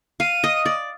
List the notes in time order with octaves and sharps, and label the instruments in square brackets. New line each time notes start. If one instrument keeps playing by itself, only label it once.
[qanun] F5 [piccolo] D#7
[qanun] D#5
D5